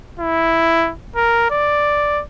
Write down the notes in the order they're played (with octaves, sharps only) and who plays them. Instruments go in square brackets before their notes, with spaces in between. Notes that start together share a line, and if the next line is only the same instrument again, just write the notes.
[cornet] E4
A#4
D5